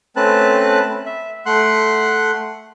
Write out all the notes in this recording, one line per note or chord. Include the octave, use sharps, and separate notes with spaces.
A3 C4 C#4 B4 A5 F#6
E5
A3 F#5 C6 F#6